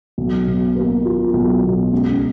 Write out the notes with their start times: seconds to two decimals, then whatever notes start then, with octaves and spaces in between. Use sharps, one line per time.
0.18 B1
0.47 B2
0.76 A#3
1.05 F4
1.34 B1
1.62 B2
1.93 C#2